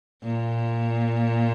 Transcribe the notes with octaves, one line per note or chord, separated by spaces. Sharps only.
A#2